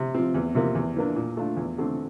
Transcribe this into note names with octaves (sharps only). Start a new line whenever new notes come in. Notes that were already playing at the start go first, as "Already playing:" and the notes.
Already playing: C3
F3 C4
E2
C3 F3 A#3
E2
E3 A#3 D4
A#2
A3 D4 F4
E2
D3 A3 C4